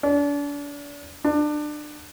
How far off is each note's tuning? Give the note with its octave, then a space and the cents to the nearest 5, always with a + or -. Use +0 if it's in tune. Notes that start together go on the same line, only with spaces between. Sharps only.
D4 -35
D4 +25